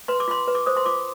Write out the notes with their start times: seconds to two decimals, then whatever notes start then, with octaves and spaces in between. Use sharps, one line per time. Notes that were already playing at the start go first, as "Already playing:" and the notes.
0.08 B4 C6
0.20 D6
0.28 F4 C6
0.48 B4
0.55 D6
0.66 C5 D#6
0.77 C6
0.86 F4 D6